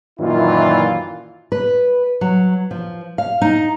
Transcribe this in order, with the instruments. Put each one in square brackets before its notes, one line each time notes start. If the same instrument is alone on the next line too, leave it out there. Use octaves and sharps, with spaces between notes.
[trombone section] F#2 A#2 D#3 E3 E4 F4
[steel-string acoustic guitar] B4
F#3
F3
F5
D#4